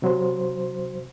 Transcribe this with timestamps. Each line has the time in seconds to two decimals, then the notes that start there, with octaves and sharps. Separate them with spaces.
0.02 C3 F#3 C5